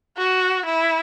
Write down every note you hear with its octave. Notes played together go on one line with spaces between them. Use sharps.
F#4
E4